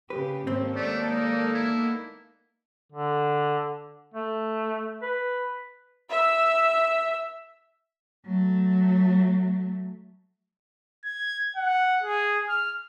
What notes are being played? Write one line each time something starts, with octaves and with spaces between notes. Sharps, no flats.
C#3 G4 B4
D#2 G#2 A#3 C4 C#4 A4
G#3 A3 D5
D#4
A#3 B3 D#4 E4
D3
A3
B4
E5 E6
F#3 A3
G#6
F#5
G#4
F6